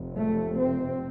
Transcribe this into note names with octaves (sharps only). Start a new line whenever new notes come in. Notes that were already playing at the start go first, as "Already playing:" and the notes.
Already playing: F1 F2 C3
A3
C4